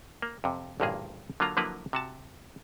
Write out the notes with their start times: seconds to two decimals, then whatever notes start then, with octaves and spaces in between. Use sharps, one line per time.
0.22 A#3
0.44 F2 C3
0.80 A1 D2 G2 A#2 A#3 G#4
1.40 D3 F#3 A#3 F4 A#5
1.57 D3 F3 F#3 A#3 E4 B4
1.93 C3 F#4 A5